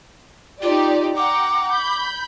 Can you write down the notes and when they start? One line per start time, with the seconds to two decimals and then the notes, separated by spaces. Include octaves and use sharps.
0.62 D#4 F4 G4 D5
1.16 F#5 G5 A#5 D6
1.72 B5 G6